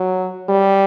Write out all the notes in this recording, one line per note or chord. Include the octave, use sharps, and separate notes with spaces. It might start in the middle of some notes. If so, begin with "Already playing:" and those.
Already playing: F#3
G3